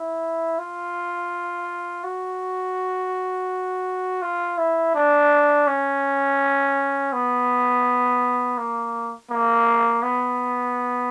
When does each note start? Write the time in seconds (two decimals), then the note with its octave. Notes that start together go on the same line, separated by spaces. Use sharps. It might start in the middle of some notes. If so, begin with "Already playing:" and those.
Already playing: E4
0.58 F4
2.04 F#4
4.22 F4
4.58 E4
4.95 D4
5.67 C#4
7.13 B3
8.58 A#3
9.30 A#3
10.03 B3